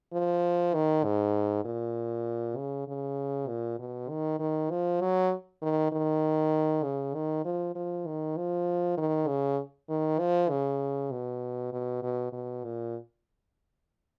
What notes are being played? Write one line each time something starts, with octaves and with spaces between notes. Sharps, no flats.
F3
D#3
G#2
A#2
C#3
C#3
A#2
B2
D#3
D#3
F3
F#3
D#3
D#3
C#3
D#3
F3
F3
D#3
F3
D#3
C#3
D#3
F3
C#3
B2
B2
B2
B2
A#2